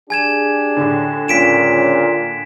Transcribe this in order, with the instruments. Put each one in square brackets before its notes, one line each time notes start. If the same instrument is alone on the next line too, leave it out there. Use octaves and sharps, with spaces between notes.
[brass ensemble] D4 G4 G#4 [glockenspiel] G#5 G#6 E7
[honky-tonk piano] A2 D3
[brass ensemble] C#2 C#4 [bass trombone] A#2 [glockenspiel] B6 D7 E7